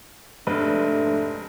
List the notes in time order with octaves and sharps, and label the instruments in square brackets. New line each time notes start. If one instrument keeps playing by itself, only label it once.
[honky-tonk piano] F1 G#2 B4 [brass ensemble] A3 D4